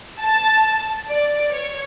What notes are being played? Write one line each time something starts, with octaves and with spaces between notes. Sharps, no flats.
A5
D5
C#5